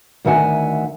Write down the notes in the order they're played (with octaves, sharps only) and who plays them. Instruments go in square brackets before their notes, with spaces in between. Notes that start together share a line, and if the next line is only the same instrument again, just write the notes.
[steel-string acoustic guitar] D2 D#3 E5 F#5 G#5